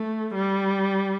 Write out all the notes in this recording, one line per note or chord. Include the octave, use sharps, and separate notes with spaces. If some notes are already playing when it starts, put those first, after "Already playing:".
Already playing: A3
G3